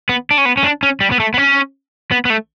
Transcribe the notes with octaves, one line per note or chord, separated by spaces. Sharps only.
B3
D4
C#4
B3
C#4
D4
C#4
G3
B3
A3
B3
C#4
B3
B3
A3